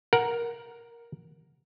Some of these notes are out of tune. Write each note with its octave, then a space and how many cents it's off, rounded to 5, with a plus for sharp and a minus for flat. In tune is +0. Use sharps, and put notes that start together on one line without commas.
A#4 +10 F#5 +0